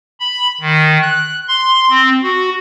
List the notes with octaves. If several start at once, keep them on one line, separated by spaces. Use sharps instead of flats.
B5
D#3
F#6
C6
C4
F#4